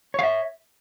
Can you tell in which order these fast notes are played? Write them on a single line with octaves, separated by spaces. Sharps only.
C#5 F5 E5